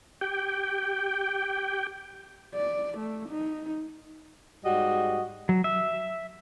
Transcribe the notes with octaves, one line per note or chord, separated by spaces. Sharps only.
G4 G5
D5
A3
D#4
G#2 G3 F#4 D#5
F#3
E5